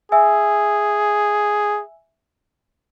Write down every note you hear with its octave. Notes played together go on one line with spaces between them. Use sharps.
G#4 E5 G#5 E6